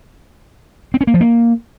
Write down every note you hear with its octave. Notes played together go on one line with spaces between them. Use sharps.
C4
C#4
A#3
F3
A#3